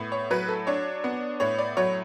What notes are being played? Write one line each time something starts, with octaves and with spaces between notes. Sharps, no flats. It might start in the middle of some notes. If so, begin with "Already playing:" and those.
Already playing: A2 B3
C#5
F#3 B4
A4
D4 C#5
B3
A2 C#5
D5
F#3 C#5